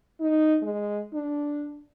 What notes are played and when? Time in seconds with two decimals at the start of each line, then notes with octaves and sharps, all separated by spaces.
0.20 D#4
0.62 G#3
1.14 D4